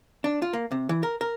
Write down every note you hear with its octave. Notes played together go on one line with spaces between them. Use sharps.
D4
F4
A#3
C3
E3
A#4
A#4